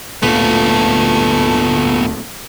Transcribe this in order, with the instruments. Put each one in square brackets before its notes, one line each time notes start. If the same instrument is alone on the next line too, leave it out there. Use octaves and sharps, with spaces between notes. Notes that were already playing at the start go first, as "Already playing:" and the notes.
[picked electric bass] D1 D2 A#2 [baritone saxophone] A3 [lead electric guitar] B3 F4